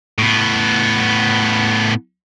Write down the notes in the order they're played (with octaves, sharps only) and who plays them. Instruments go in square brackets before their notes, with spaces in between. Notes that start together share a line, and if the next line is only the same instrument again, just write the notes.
[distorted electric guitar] A2 B3